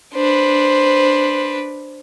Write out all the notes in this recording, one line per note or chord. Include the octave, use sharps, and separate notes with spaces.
D4 B4 C5